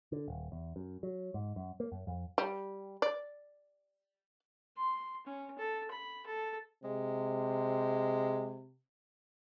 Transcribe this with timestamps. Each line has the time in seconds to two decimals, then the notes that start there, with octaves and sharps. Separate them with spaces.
0.12 D3
0.28 D#1
0.52 E2
0.76 F#2
1.03 F#3
1.34 G#2
1.56 F#2
1.80 A#3
1.92 F#2
2.07 F2
2.38 G3
3.02 D5
4.77 C6
5.26 C#4
5.58 A4
5.91 B5
6.26 A4
6.84 C3 G#3